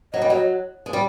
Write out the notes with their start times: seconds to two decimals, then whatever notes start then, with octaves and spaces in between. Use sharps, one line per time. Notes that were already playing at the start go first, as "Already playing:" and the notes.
0.13 F#3 D#5
0.22 G3
0.29 F#3 D#5
0.86 G#3
0.93 G3